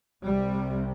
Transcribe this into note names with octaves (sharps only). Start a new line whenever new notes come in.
C2 C3 G3